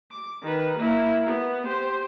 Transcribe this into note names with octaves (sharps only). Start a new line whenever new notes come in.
D6
D#3 B4
A#3 E4
B3
G4 C5